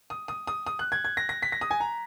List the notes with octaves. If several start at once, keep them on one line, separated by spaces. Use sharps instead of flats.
D#6
D#6
D#6
D#6
F#6
G#6
G#6
A#6
A#6
B6
A#6
D#6
G#5
A#5